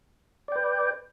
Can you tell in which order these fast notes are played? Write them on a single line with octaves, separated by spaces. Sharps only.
D5 G5 B4